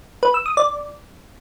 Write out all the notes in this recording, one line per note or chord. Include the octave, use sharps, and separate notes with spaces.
B4
E6
D#6
D5